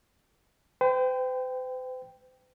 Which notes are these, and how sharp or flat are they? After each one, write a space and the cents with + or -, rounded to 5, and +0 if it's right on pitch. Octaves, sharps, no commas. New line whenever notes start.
C5 -45 G5 +0